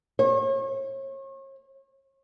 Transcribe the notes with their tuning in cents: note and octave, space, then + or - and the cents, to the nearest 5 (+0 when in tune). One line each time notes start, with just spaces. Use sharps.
C#5 -40